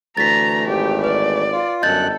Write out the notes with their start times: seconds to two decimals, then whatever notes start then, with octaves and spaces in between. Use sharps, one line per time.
0.17 D2 E3 A3 A#5 A6 B6
0.68 G#1 G4
1.04 B4 D5
1.52 F4
1.83 G1 F#2 A4 D#5 F#6 G6 A6